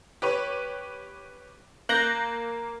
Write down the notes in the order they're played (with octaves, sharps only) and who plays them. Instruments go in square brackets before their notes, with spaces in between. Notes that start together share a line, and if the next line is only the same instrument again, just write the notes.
[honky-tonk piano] G4 B4 C#5
[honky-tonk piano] A#3 [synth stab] F#6 G6 A#6